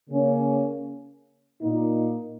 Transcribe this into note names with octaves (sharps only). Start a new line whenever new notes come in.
C#3 A#3 C#4
A#2 A#3 D#4